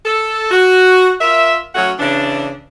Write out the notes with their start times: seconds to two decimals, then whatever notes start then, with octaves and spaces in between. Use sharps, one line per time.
0.04 A4
0.51 F#4
1.20 F4 A#4 E5
1.74 F#3 A3 C#4 F#4 F#5
1.98 C#3 E3 D4